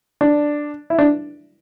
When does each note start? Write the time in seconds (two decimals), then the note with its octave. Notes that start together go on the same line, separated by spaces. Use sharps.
0.21 D4
0.90 E4
0.98 D4